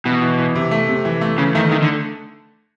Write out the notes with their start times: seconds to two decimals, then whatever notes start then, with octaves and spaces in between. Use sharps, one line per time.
0.05 B2 E3
0.22 E3
0.38 E3
0.55 C3
0.71 A3
0.89 C3
1.05 E3
1.21 A3
1.38 C#3 E3
1.55 D#3 A3
1.71 D#3 A3
1.82 D3